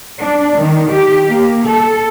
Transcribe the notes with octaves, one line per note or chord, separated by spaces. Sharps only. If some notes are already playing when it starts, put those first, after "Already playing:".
D4
D#3
G4
A#3
A4